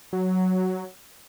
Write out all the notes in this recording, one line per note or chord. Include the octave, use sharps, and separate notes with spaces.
F#3